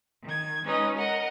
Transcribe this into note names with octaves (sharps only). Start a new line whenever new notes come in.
D#3 G#6
G#3 C#4 D#4 B4 D#5
A#4 D#5 F#5